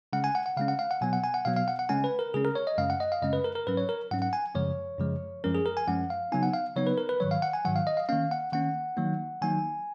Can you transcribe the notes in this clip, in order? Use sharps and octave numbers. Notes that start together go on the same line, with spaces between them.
C#3 G#3 C#4 F#5
G#5
F#5
F#5
C#3 G#3 C#4 F5
F#5
F5
F#5
B2 F#3 B3 G#5
F#5
G#5
F#5
B2 F#3 B3 F5
F5
F#5
F#5
C#3 G#3 C#4 G#5
B4
A#4
C#3 G#3 C#4 G#4
A#4
C#5
D#5
F#2 C#3 G#3 C#4 F5
F#5
D#5
F5
F#2 C#3 G#3 C#4 D#5
B4
A#4
A#4
G#2 F#3 C#4 B4
C#5
A#4
G#2 F#3 C#4 F#5
F#5
G#5
F#2 C#3 F3 G#3 C#5
F#2 C#3 F3 G#3
F#2 F3 G#3 C#4 A#4
G#4
A#4
G#5
F#2 F3 G#3 C#4 F#5
F5
C#3 F#3 B3 D#4 G#5
F#5
F5
C#3 F#3 B3 D#4 C#5
B4
A#4
B4
G#2 D#3 F#3 C#5
F5
F#5
G#5
G#2 D#3 F#3 F#5
F5
D#5
F5
D#3 A#3 C#4 F5
F#5
D#3 A#3 C#4 F#5
D#3 F#3 A#3 D#4
D#3 F#3 A#3 D#4 G#5